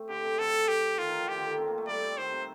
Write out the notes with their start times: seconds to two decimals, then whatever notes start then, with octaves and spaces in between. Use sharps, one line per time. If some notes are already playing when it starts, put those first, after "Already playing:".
Already playing: A3 C4
0.09 D3 G4
0.24 C3
0.39 D3 A4
0.68 G4
0.98 D#3 F4
1.08 D#3
1.18 F3
1.28 D#3 G4
1.38 D3
1.48 D#3
1.58 C4
1.68 A#3
1.78 A3
1.87 G3 D5
2.03 G3
2.17 D#3 C5
2.32 C3